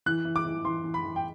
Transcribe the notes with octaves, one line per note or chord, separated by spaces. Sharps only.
E3 F#6
E3
D6
E3
E3 C6
E3
B5
E3
G5